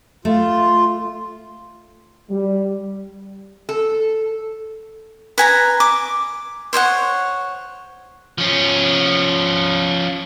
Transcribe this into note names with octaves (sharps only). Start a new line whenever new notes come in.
A3 F4
G3
A4
B4 G#5 A#5
D6
C5 C#5 D#5 F#5
F3 C#4